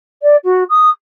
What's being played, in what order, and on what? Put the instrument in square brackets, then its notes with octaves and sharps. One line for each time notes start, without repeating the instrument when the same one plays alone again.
[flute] D5
F#4
D#6